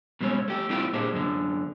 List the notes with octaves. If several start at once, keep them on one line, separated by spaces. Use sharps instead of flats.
B2 G3 G#3 C4 C#4
A3 G4
G3 A3 C4 E4 F4 G4
A#2 D4 G4 G#4 C5 D#5
F#2 D3